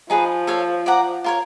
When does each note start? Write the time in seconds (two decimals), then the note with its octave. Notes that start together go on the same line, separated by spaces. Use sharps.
0.10 F3 D#4 G#4 B4
0.47 A4 C#5 F5
0.86 D5 F#5 A#5
1.24 F4 A#4 C#5